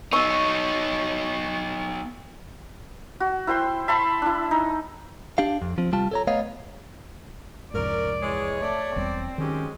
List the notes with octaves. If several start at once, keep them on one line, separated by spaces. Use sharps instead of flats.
B3 D#4 C#6 E6
F#4
E4 C5 G5 C6
E5 A5 B5 C6
D4 E4
D#4
D4 G4 F5
F2
F3 C4
C2 C3 G3 F4 A5
A4 C#5 A#5
A3 B3 C#5 D#5 F5
C2 F2 G#2 C#4 A#4 D5
E3 G#3 C#5
A3 D5
E1 E2 G3 C4
D#3 F#3 G#3 C#4 G4